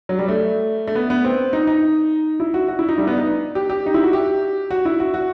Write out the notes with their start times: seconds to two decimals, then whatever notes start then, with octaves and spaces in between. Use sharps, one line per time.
0.09 F#3
0.19 G3
0.28 A3
0.87 A3
0.95 B3
1.10 B3
1.24 C4
1.53 D#4
1.67 D#4
2.40 E4
2.54 F#4
2.68 F#4
2.79 E4
2.89 D#4
2.98 G3
3.07 B3
3.17 D#4
3.55 G4
3.70 G4
3.86 D#4
3.94 E4
4.04 F#4
4.13 G4
4.71 F#4
4.85 E4
5.00 F#4
5.14 F#4